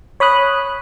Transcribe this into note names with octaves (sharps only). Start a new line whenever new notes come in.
C#5 B5 D#6 F#6